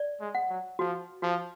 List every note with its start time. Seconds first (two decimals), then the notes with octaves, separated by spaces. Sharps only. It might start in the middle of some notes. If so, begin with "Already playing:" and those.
Already playing: D5
0.20 G#3
0.35 F#5
0.49 F#3
0.79 F3 F#4
1.22 F3 F#4